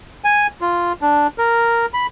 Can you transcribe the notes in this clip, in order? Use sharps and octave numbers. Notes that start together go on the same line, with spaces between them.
G#5
F4
D4
A#4
B5